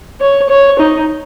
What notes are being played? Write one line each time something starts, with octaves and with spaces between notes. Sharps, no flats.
C#5
C#5
D#4